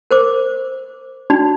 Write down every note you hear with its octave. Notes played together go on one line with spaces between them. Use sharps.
A#4 C5 D6
D4 D#4 F#4 D5